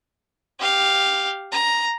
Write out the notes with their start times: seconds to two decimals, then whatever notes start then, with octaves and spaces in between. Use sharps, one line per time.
0.60 G4 F5
1.52 A#5